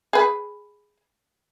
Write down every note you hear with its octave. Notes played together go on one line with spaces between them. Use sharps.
G#4 B4